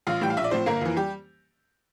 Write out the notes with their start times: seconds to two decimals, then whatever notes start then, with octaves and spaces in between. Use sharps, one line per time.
0.07 A1 F4 F5
0.21 A2 E3 G3 G5
0.30 F5
0.37 A#1 E5
0.44 D5
0.51 A2 F3 C4 C5
0.66 G1 A#3 A#4
0.81 F2 E3
0.97 G3 G4